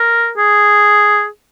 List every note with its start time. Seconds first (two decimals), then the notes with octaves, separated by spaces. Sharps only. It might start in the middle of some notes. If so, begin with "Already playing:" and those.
Already playing: A#4
0.37 G#4